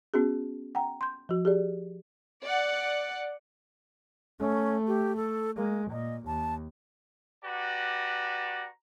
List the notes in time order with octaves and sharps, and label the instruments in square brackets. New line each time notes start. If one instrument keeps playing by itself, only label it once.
[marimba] B3 C#4 F#4 G#4
F#5 G5 A#5
C6 G6
F3 F#4
G4 G#4 D5
[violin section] D5 F#5
[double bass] A3 [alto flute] C#4
[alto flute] G4
A4
[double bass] G#3 [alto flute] A#3
[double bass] A#2 [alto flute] D#5
[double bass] D#2 [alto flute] A5
[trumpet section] F#4 G4 B4 D5 A5 A#5